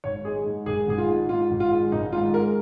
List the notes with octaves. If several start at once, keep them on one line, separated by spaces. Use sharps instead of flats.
G#1 C#5
G#3 G#4
G#2
G#1 G#4
G#1 G#4
F4
G#2
G#2 F4
G#1
F4
G#3
G#1 D#4
G#2 F4
G#3 A#4